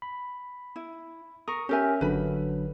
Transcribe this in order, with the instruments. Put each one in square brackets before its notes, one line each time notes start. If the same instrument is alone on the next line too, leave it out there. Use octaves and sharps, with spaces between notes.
[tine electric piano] B5
[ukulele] E4
[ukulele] A#4 [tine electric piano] C#6 D#6
[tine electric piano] C#4 E5 [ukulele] G4 A#4 G#5
[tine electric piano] G1 D3 F#3 [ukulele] B4 B5